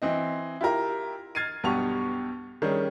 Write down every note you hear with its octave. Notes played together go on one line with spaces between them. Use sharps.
E3 C4 D#5
E4 F4 G4 A#4
F6 G#6 A6 C7 D#7
B1 G2 B3 G4 C#6 F7
D#3 G3 C#4 G#4